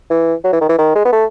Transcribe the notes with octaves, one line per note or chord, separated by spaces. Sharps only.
E3
F#3
E3
D#3
E3
D#3
G#3
B3
A3